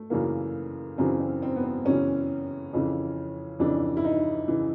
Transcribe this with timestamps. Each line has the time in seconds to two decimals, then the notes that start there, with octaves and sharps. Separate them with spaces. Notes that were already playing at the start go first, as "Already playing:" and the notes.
Already playing: A3
0.10 F#2 C#3 E3 A#3
0.98 F#2 C#3 E3 C4
1.20 C4
1.42 C4
1.56 B3
1.63 C4
1.85 F#2 C#3 E3 C#4
2.73 F2 C#3 E3
3.60 F2 C#3 E3 D4
3.97 E4
4.04 D#4
4.48 C#3 E3